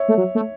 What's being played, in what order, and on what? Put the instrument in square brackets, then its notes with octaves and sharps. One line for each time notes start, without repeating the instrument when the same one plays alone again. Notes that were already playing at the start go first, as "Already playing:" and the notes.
Already playing: [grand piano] C#5 E5
[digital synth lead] A3
F#3
A3